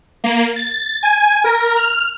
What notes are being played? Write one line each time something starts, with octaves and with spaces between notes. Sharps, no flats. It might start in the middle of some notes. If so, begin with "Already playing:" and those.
A#3
A6
G#5
A#4
F6